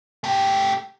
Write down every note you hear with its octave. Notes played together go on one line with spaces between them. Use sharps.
A3 G4